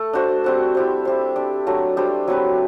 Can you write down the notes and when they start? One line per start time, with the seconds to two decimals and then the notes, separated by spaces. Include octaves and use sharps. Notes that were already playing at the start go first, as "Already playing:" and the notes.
Already playing: A3 A4
0.13 D4 F#4 C5
0.44 G3 C4 F#4 C5
0.75 E4 G4 C5
1.05 E4 G4 C5
1.36 D4 G4 D5
1.67 F#3 A3 D4
1.97 G3 D4 G4 C5
2.27 F#3 C4 G4 B4